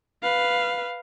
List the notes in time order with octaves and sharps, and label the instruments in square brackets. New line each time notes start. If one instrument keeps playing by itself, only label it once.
[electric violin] B4 F5